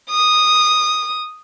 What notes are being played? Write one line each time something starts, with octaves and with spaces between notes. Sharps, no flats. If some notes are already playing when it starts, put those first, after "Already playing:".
D#6